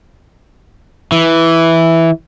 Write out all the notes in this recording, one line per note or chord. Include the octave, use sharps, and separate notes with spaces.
E3